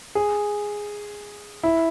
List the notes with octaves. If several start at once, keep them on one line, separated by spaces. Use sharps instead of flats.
G#4
E4